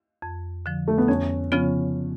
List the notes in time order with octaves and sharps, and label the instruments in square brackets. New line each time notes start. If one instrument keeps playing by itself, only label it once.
[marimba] F2
D3 F3
[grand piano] A3
B3
[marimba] F2 [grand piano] C#4
[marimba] C#3 F3 B3 F4 [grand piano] C#4